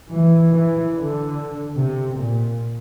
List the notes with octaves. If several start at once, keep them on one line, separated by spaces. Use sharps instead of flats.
E3
E3
D3
C3
A#2